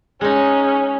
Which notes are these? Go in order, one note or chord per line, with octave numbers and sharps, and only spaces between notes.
G#3 C#4 D#4